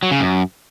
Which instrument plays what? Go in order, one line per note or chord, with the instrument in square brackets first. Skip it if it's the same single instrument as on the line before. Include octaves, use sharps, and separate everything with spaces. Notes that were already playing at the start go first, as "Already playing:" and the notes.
[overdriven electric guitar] F#3
C#3
F#2